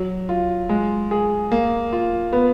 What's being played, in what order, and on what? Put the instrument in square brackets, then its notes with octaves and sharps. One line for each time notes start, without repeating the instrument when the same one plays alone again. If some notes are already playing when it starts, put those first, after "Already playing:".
Already playing: [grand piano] F#3
F4
G#3
G#4
A#3
F4
B3